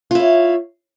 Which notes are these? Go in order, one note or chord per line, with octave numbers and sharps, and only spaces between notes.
E4 F4 C#5